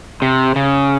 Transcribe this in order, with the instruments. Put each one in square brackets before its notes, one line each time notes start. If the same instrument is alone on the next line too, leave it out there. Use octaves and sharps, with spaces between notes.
[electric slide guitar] C3
C#3